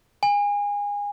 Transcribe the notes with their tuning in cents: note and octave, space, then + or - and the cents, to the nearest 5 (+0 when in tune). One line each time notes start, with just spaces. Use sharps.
G#5 -25